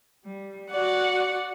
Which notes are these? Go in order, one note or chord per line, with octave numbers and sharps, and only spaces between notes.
G3
F#4 D5 F#5